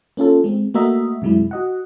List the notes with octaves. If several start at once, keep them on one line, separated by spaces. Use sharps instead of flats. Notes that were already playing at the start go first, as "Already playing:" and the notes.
A#3 C#4 F4 A4
G#3 C4
A3 A#3 F#4 A#4 D#5 E5
F#2 C3 F#3 G#3 E4
F#4 D#5 F#5